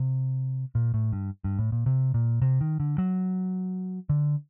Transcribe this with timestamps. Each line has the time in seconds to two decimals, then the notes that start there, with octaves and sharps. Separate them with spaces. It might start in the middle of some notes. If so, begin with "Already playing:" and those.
Already playing: C3
0.75 A#2
0.94 A2
1.13 G2
1.44 G2
1.59 A2
1.72 A#2
1.86 C3
2.14 A#2
2.42 C3
2.61 D#3
2.80 D3
2.98 F#3
4.09 D3